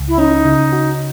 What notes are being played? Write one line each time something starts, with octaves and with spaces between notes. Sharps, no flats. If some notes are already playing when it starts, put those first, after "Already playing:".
Already playing: C#2
E4
C#4 D#4
C#3
F#4